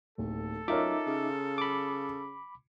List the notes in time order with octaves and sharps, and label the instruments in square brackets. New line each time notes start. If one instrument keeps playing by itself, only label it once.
[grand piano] D1 [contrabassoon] D#2 [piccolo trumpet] A4
[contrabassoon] F#2 [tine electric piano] D#4 E5 D6 [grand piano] F4 A#4 C#5
[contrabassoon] C#3
[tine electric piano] B5 D6